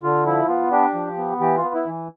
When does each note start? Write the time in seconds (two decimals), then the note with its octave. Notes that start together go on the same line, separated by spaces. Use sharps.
0.03 D3 F4
0.26 F3 E4
0.48 B3 F4
0.71 D4 G4
0.94 F3
1.18 B3
1.40 E3 G4
1.57 F4
1.63 B3
1.74 E4
1.86 E3